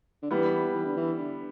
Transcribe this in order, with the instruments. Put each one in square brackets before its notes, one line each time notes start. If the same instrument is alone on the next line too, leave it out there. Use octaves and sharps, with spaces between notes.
[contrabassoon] D3
[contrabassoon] E3 [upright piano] G3 B3
[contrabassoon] E3
D3
E3
D3